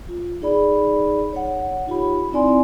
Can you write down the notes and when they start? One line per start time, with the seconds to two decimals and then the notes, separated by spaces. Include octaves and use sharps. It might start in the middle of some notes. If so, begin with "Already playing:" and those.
0.09 F4
0.42 D#4 G#4 D5 B5
1.33 C#5 F#5
1.87 D#4 F4 G4 B5
2.32 C4 D#4 E4 D5 G#5 C6